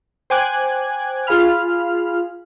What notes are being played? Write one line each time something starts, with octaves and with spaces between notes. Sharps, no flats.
C5 G5 G#5 D6 F#6 G#6
F4 G#4 F5 B5 F6